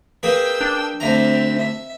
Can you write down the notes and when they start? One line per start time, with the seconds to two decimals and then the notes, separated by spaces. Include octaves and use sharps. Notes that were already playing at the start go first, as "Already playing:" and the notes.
0.23 A#3 G#4 B4 G5 E6
0.61 D4
1.00 D2 D3 C4 E5 A#5
1.58 E5